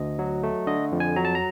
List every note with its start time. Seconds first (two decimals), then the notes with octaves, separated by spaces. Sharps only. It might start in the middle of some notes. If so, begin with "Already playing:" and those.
Already playing: D2 D#5
0.19 F#3
0.43 A3
0.67 D3 D#5
0.92 F2
1.00 G#5
1.16 F#3 A#5
1.25 A5
1.35 A#5